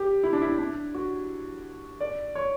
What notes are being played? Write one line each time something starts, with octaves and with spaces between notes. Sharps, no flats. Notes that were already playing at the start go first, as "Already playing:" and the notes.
Already playing: G4
E4
D4
E4
D4
F#4
D5
C#5